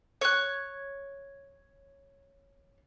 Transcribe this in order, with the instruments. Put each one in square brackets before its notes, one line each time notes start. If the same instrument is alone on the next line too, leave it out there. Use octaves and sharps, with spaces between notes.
[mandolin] C#5 F#6